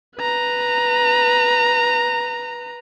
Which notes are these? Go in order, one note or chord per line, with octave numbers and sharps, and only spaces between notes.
B4 A#5